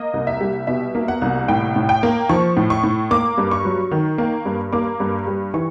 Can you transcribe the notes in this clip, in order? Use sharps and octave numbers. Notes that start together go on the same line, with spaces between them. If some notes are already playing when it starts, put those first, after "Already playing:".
Already playing: A#3 D#5
C2
E5
G3
B2 E5
A#3
F#5
C2
A2 G5
A2
G5
A#3
F3 C#6
A2
C#6
A2
A#3 D6
G2
C#6
F#3
D#3
A#3
G2
A#3 D6
G2
G3
E3 C#6